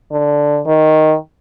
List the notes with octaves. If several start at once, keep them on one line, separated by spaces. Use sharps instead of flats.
D3
D#3